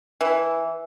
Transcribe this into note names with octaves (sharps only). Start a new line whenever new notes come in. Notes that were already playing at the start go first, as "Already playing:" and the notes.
E3